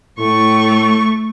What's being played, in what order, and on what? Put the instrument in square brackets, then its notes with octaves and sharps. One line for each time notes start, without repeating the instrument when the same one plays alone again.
[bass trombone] A2 [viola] A3 C#6